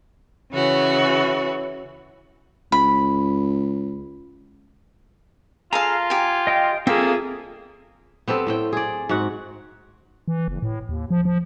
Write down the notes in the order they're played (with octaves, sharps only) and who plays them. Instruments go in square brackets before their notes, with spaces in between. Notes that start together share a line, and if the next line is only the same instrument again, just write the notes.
[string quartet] C#3 E3 F#4 C#5
[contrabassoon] C#2 [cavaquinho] B5
[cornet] F4 [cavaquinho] G#4 A4 F5 [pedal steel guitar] A#5
[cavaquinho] G4 G#5
[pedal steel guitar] D#5 G5
[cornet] A#3 [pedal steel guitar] C4 A4 [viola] F4 G#4 [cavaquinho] E5
[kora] B3 C4 G4 A4
A2 C4 G5
G#4 D5
G#2 F#4 F#5
[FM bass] E3
F#1
A2
D#2
F3
F3